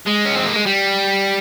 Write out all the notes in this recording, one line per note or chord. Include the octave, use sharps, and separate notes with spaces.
G#3
C#4
C4
A#3
G#3
G3